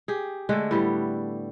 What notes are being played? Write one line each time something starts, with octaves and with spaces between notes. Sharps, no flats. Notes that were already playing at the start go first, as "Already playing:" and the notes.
G4 G#4
D3 G#3 A3
A2 G3 B3